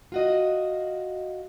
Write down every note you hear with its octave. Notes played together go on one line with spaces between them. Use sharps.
F4 F#4 D#5